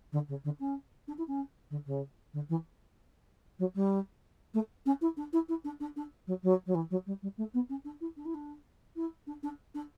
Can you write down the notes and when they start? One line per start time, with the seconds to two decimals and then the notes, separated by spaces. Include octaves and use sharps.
0.12 D3
0.28 C#3
0.44 D3
0.59 C#4
1.07 D4
1.18 E4
1.27 C#4
1.70 D3
1.86 C#3
2.33 D3
2.49 E3
3.59 F#3
3.75 G3
4.54 A3
4.85 C#4
5.01 E4
5.16 D4
5.32 E4
5.48 E4
5.64 D4
5.80 D4
5.96 D4
6.27 F#3
6.43 F#3
6.66 F#3
6.74 E3
6.90 F#3
7.06 G3
7.22 G3
7.37 A3
7.54 B3
7.69 C#4
7.84 D4
8.00 E4
8.16 D4
8.25 E4
8.34 D4
8.95 E4
9.27 D4
9.43 D4
9.74 D4